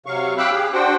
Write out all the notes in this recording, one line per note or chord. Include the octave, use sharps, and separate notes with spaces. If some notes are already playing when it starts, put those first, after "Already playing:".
C3 F#3 F5 C#6
F5 G5 B5 D6 E6 F#6
G4 G#4
D4 F#4 C5 F#5 G5